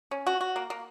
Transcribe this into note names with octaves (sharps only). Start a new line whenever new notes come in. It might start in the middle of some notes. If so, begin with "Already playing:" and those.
C#4
F#4
F#4
A#3
A#3